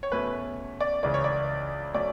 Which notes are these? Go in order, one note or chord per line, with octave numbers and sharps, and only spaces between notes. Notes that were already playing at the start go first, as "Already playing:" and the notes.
C#5
E2 B2 A3 C#4 B4
D5
C#2 C#3 E3 D5
C#5
D5
F#3 A3 C#4 D5